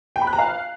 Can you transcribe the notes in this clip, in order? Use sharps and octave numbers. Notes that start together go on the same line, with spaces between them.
G5
B5
F#6
A#5
F5